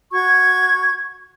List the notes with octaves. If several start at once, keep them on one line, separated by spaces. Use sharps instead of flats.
F#4 C#6 G#6